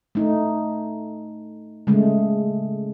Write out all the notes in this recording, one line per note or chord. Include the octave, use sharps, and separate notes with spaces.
A3 D#4
C#3 G#3 A3